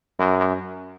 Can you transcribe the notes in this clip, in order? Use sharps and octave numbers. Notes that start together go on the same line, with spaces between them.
F#2